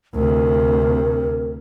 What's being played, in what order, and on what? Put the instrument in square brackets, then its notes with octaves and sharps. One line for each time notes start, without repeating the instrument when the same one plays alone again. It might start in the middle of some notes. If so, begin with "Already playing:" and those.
[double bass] D2 C3 [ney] A#4